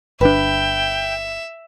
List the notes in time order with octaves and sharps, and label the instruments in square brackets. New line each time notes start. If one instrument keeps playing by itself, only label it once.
[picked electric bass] G1 D4 [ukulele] B4 [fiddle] E5 [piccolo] G5